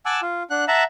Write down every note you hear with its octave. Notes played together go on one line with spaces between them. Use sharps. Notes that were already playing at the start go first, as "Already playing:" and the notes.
F#5 G#5 A5 D6 E6
F4
D4 F#5 F#6
E5 F#5 A5 A#5